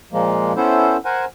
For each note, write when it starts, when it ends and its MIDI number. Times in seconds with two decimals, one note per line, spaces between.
0.13 0.53 46
0.13 0.53 53
0.13 0.53 56
0.13 0.53 58
0.56 0.97 59
0.56 0.97 61
0.56 0.97 64
0.56 0.97 69
0.56 0.97 72
1.05 1.25 70
1.05 1.25 72
1.05 1.25 78
1.05 1.25 80